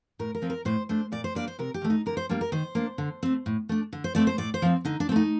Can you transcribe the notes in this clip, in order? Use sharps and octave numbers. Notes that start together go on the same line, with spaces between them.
A2 A#4
A#4
F3 C4
A#4
A2 C5
A3 D4 C5
A#2 D5
C5
G3 A#3 D4 D5
C5
C3 A#4
G4
D#3 A3
D#4
D3 A#4
C5
G3 A#3 D4
A#4
D#3 C5
A#3 D4
D3
A3 C4
A2
A3 D4
D3
C5
A3 C4 D5
C5
A2 D5
C5
F3 C4
D3 D#4
D4
C4
A3 D#4